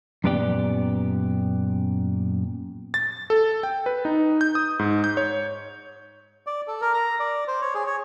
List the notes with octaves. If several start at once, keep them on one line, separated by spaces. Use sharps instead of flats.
F#2 A#2 B3 G4 D5 G5
A6
A4
G5
B4
D#4
G6
D#6
G#2
G6
C#5
D5
A4
A#4
A#5
D5
C5
C#5
G#4
C#5